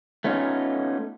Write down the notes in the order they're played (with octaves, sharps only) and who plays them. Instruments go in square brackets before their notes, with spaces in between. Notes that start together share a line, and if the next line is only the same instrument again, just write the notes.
[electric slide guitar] A3 B3 C#4 D#4 F4